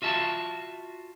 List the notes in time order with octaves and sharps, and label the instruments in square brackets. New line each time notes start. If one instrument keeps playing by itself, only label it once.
[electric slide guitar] F4 F#4 E5 A5